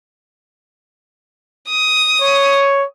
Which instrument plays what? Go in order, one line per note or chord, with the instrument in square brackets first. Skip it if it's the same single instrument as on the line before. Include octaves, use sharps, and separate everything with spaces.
[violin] D#6
[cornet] C#5